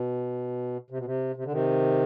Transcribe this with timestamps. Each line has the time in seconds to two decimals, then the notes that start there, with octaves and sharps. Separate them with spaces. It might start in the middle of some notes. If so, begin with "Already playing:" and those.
Already playing: B2
0.90 C3
0.98 B2
1.05 C3
1.36 C3
1.44 D3
1.52 C3 D#3